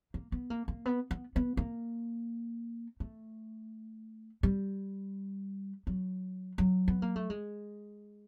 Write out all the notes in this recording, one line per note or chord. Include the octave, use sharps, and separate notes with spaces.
A#3
B3
A#3
A#3
B3
B3
B3
A#3
A3
G3
F#3
F#3
B3
A#3
A3
G#3